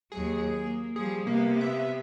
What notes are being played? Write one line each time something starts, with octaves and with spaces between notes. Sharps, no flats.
D#2 F#3 G#4
A#3
F3 G3 G#4
C3 A#3 B3
E5